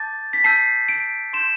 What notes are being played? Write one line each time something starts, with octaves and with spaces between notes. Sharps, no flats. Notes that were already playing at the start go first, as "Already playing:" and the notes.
Already playing: A5 D6 G6 A6
B6
A5 E6 G6 C7
D7
C6 G6 E7